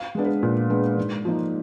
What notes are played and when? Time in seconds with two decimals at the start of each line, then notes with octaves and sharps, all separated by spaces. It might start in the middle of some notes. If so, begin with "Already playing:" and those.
Already playing: F5
0.15 G#3 B3 D4
0.24 B4
0.43 A#2
0.70 G#3 B3 D4
0.98 G#2
1.25 F3 A#3 D#4